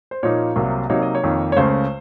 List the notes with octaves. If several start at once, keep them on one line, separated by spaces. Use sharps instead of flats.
C5
A#2 F3 A#3 D#4 C#5
C2 C3 F#3 A#3
C3 F#3 A#3 D#4 C#5
D#5
C#5
F2 D#3 A#3
C#5
C#2 C#3 A3 C#4 C5